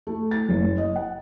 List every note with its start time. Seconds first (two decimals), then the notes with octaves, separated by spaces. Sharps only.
0.07 A3
0.31 A6
0.49 F#1
0.78 D#5
0.96 F#5